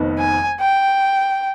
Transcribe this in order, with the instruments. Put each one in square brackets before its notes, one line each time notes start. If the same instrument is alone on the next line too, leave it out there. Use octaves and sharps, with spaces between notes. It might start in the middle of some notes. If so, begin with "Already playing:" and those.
Already playing: [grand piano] F1 F2 D#3 B3 D#4
[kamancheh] G#5
G5